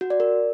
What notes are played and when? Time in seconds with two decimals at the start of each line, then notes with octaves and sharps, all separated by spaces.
0.01 F#4
0.10 D5
0.20 A#4